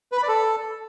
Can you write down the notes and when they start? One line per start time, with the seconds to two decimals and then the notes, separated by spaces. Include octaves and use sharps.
0.12 B4
0.17 B5
0.23 D5
0.28 A4